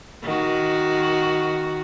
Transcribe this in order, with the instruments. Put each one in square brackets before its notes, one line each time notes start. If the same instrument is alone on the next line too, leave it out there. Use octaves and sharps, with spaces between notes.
[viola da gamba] D#3 F#4